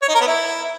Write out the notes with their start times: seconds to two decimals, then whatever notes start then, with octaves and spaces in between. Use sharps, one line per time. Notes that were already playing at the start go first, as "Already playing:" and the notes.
0.02 C#5
0.08 D#4
0.15 A#4
0.21 B3
0.27 E4